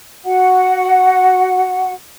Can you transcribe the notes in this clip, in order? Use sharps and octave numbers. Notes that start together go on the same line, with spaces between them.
F#4 F#5